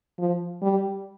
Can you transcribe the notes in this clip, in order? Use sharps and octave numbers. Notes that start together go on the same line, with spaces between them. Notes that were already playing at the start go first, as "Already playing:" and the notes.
F3
G3